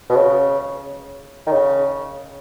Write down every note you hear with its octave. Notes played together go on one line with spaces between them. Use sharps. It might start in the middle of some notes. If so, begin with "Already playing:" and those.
B2
C#3
D#3
C#3